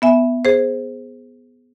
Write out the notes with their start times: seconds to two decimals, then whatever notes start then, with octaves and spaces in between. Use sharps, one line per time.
0.02 B3 E5 G#5
0.45 G#4 C5